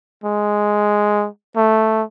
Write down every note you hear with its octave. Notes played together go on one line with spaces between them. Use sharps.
G#3
A3